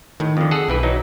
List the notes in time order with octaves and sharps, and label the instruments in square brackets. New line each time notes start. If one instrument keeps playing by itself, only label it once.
[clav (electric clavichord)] A2 [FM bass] D#3
[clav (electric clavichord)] F2 D3
G#4 A4 F#5
[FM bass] B1 [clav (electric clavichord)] G2 E3 B4
[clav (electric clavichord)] E3 F#3 D#4